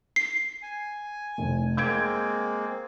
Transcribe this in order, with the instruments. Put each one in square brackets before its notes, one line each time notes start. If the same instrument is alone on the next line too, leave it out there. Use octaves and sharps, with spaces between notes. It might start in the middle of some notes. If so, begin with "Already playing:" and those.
[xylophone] C7
[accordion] G#5
[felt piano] F1
[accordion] G#3 A#3 C4 [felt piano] G6 G#6 D7